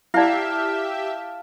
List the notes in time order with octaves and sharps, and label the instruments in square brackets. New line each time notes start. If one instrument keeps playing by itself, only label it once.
[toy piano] E4 D5 [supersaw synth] G4 E5 [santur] F5 A5